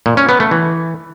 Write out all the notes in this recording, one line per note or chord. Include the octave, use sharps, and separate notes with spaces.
A#2
C#4
B3
A3
E3